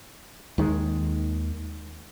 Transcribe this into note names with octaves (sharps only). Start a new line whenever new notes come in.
D#2 D#3 E3 G#3